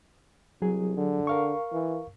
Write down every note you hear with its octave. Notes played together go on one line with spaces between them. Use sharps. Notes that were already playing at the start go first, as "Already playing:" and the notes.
C2 F#3 G#4
D3
A#4 F5 C#6
E3